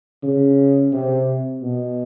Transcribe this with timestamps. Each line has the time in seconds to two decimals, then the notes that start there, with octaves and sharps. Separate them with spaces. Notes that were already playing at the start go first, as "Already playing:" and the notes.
0.23 C#3
0.93 C3
1.62 B2